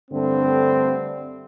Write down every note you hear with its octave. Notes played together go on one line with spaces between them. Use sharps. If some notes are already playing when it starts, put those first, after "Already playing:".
G2 D3 A3 C4